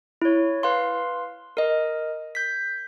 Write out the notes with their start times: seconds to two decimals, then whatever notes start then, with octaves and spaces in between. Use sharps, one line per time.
0.22 E4 C#5
0.63 B4 F5 C6
1.57 A#4 D#5
2.35 G6 B6